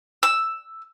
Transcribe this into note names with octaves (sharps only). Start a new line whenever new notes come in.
E6